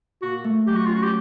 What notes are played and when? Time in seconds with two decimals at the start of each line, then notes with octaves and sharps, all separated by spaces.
0.22 A#2 F#4
0.44 A3
0.67 F#3 G4
0.76 F#4
0.86 C#4 F4
0.95 F#4
1.03 G4